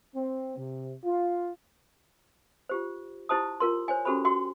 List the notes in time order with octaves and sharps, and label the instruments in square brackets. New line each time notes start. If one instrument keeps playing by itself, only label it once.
[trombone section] C4
C3
F4
[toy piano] F4 G4 C5
E4 G4 C5 A5 D#6
F4 A#4 C6
C5 C#5 G#5
C#4 F#4 G4 A4 C5 B5
F#4 G5 C6